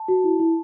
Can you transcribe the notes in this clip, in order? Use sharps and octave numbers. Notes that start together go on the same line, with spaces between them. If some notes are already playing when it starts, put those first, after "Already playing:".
Already playing: A5
F#4
E4
E4